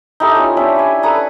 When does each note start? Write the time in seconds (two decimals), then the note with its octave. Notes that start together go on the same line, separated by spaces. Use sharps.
0.20 D#4 E4 G4 A4
0.35 C#4 F4 G#5
0.57 C#4 D4 G4 E5
0.76 E4 G#5
1.03 A4 B4 A#5 D#6